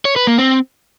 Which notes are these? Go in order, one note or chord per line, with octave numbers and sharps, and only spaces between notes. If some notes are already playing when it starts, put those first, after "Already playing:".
C#5
B4
A#3
C4